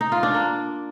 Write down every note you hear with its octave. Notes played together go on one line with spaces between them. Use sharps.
D#4
F4
D4
A#3